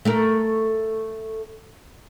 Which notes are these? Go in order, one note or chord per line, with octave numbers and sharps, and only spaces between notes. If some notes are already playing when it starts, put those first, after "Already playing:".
A3 A4 A#4